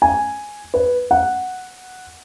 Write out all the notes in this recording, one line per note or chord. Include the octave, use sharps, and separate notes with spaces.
G#5
B4
F#5